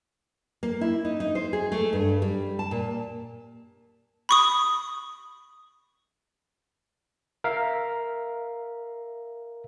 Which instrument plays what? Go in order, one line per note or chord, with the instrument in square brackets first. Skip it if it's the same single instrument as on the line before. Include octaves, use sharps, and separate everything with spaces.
[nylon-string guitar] A#3
E4
D#4
D#4
C5
G#4
A3
G2
G3
A5
A#2
[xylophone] B5 C#6 D#6
[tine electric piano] A#4 E5 F5